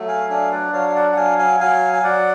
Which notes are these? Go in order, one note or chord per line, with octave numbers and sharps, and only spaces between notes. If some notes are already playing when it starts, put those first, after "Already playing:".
Already playing: F#3 A3
F5 G#5
D4 F5 G#5
B4 D5
F#3 C#5 F5
F5
D5 F#5
F#5
F#3 F5 G#5
F5 G#5
F#3 F5 G#5
G#5
F#3 D5 F#5